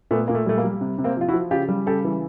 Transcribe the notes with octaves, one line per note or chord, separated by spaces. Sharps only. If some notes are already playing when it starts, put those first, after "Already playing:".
A#2 A3 B3
A#2 A#3
A3
G3 A3
A#3
G3
C3
C3
A#3 C4
F3 F4
E4 F#4
F3
C#3 F4 G4
G3
C#3 G4 A4
E3